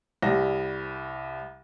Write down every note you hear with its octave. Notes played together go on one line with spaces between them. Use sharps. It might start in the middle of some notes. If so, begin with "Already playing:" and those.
C2 G3 A#6